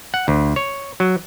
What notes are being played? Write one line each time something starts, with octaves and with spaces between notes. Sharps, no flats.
F#5
D2
C#5
F#3